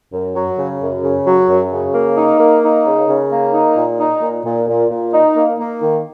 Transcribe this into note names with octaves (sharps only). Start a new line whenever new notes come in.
F#2
F#3
C#3
F#2
C#3
F#3
F#2
C#3
A#3
D#4
A#3
D#4
C#3
C#3
A#3
D#4
A#2
D#4
A#2
A#2
A#2
A#2
D#4
A#3
A#3
D#3